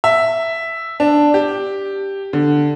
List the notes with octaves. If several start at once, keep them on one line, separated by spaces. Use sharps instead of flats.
E5
D4
G4
D3